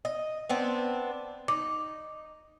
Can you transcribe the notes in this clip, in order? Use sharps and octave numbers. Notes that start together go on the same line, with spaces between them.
D#5
B3 C4 D4
D#4 D6